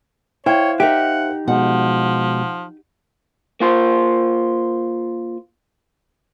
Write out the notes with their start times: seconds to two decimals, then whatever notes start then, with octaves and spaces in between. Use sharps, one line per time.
0.46 E4 C5 C#5 F5 G5
0.80 D#4 G4 A#4 E5 F#5
1.48 B2 F3 G#3 F#5
3.60 A#3 F4 C5